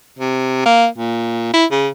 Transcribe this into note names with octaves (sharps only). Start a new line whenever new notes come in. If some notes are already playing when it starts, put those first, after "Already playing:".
C3
A#3
A#2
E4
C#3